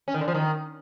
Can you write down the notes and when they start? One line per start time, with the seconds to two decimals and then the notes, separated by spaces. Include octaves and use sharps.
0.08 C#4
0.14 D#3
0.21 D3
0.28 F3
0.34 D#3